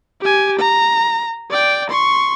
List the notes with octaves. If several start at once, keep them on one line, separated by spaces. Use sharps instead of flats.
G4 G#5
A#5
D5 G5
C6 C#6